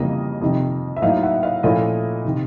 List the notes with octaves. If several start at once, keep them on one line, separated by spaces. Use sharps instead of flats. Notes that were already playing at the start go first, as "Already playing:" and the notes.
Already playing: F2 C#3 E3 G3 A#3 D#5
F2 C3 D#3
E5
A2 F#3 A#3 D#4 D#5 F5
E5 F#5
D#5 F5
A#2 F3 A3 C#4 E4 D#5 F5
C3 D#3